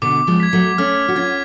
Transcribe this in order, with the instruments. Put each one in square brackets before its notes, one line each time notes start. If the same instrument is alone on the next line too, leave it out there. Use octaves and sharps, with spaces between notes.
[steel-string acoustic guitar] B2 D3 [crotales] D6
[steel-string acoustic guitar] F3 G#3
[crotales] G#6 B6
[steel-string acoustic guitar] F#3 A3
[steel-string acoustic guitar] A3 C#4 [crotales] F6
[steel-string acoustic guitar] F#4
[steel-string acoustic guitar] C#4 F4 [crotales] G#6 B6